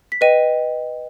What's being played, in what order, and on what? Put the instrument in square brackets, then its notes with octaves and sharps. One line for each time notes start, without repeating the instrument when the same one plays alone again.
[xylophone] B6
B4 D#5 G5 D#7